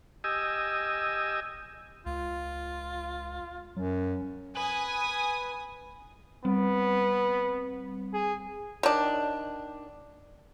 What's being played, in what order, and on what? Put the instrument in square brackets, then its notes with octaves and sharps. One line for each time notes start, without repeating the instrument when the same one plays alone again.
[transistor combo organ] G4 D#5 G#5 E6
[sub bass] C#2 [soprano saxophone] F4
[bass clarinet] F#2 [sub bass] F#3
[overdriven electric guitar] B4 [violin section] G#5 D#6
[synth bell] G3 C4 [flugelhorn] B3
[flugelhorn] G#4
[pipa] D#3 D4